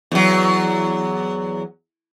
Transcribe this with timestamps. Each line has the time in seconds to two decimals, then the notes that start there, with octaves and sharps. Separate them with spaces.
0.12 E2 F#3